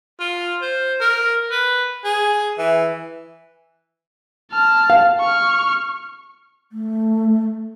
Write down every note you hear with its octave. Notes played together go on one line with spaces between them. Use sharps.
F4
C5
A#4
B4
G#4
E3
A5 F6
F5
C#6 F6
A3